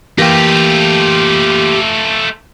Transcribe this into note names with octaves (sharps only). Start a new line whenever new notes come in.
E3 A3 A#3 F4 G4 G5 A#6